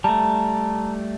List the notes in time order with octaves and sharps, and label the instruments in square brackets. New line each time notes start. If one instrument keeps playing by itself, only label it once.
[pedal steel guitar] G3 A3 [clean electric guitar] A5 A#5